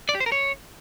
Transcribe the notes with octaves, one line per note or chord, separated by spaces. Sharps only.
D5
G4
C5
A#4
C#5